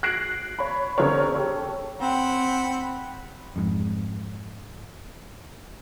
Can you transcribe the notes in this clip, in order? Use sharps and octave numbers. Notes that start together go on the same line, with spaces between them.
F#6 G#6 A#6 C7 D7
C#5 B5
D3 B3 C4 G#4 A#4 C#5
G4 A4 C#5
C4 F#5 B5
F2 G#2